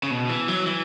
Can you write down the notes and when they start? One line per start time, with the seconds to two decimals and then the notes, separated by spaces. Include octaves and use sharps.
0.03 C#3
0.10 B2
0.29 E3
0.48 F#3
0.66 E3